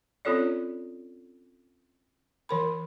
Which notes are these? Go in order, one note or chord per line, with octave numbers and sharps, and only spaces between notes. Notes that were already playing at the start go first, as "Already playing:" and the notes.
C4 C#4 F4 A4 C#5 D5
E3 A#4 B5